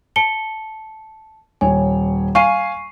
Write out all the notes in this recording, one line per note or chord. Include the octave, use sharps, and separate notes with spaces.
A5 C#7 G7
D#1 C#5 G#5
F5 G#5 C#6 C7 D#7